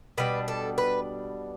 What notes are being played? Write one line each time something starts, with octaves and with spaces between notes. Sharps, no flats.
B2 G3 D4 B4
A4
B4